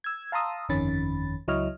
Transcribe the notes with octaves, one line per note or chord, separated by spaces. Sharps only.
E6 G#6
F5 A5 A#5 C6 D#6 E6
G1 F2 D#3 C#4 B5 A6
C#2 F#3 E4 C#5 D#5 F6